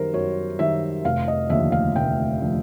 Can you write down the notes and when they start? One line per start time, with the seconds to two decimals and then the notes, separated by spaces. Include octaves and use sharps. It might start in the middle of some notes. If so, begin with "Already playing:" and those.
Already playing: F#2 D#3 G3 A#4 C5
0.14 F#2 C#5
0.59 D#3 G3 E5
1.05 F1 F5
1.28 D#5
1.50 D#2 D3 F3 A3 E5
1.72 F5
1.95 F1 G5
2.40 D3 F3 A3